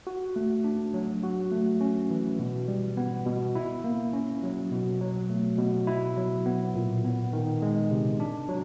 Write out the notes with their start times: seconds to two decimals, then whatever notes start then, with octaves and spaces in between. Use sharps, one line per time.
0.07 F#4
0.36 A3
0.64 D4
0.94 F#3
1.23 F#4
1.52 A3
1.81 C#4
2.10 E3
2.39 B2
2.68 G3
2.97 B3
3.26 B2
3.55 E4
3.84 A#3
4.13 C#4
4.43 F#3
4.71 B2
5.01 F#3
5.30 A3
5.58 B2
5.87 E4
6.17 F#3
6.46 B3
6.75 A#2
7.04 B3
7.33 D#3
7.62 G#3
7.91 C3
8.20 D4
8.49 F#3